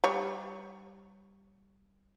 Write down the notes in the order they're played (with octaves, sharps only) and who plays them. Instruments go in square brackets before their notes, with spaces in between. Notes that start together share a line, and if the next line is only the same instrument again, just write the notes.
[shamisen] G3 C#5